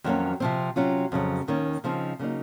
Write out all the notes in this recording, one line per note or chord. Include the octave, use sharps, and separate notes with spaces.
F2 D#3 F#3 A#3 C#4
C3 F3 C4
C3 F#3 C#4 F4
F2 C#3 F#3
D#2 D#3 A#3 C#4
C#3 F3 C4 D#4
C#3 F#3 A#3 D#4